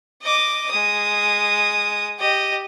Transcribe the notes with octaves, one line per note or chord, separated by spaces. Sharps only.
D#5 D6
G#3 D#6
G4 D#5